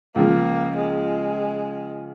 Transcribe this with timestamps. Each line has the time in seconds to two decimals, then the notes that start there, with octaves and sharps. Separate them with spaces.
0.16 C#2 C#3 F3 A#3
0.77 G#3